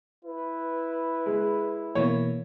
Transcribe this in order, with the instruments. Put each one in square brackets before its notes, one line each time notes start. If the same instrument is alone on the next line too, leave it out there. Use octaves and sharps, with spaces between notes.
[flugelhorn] E4 [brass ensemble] B4
[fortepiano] G#3
[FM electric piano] B2 E3 A#3 [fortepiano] C#5